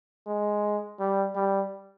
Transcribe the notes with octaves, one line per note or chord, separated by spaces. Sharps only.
G#3
G3
G3